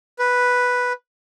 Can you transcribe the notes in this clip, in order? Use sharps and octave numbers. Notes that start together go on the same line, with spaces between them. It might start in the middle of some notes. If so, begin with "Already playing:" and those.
B4